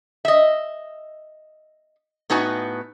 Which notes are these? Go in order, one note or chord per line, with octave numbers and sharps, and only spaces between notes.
D#5 E5
A2 B3 D#4 F#4 B4 G#5